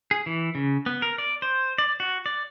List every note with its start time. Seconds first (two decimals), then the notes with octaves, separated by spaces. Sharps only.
0.11 G#4
0.26 E3
0.55 C#3
0.86 B3
1.02 A#4
1.18 D5
1.42 C5
1.78 D5
2.00 F#4
2.26 D5